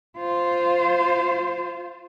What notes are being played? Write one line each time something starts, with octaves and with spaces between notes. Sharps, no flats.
F4 C5